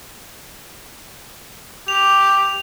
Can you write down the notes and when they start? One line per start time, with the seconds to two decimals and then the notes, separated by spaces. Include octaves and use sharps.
1.88 G4 F7